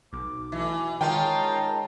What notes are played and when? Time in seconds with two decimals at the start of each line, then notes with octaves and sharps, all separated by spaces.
0.13 B1 D6
0.52 B2 E3 A3
0.74 B2
1.01 D#3 G#3 C#4 F4 D#5 G5 A5 A#5